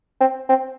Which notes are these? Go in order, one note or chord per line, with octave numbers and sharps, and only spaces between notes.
C4
C4